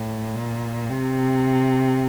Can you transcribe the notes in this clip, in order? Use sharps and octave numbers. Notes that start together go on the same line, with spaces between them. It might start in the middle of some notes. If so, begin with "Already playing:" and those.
Already playing: A2
A#2
C3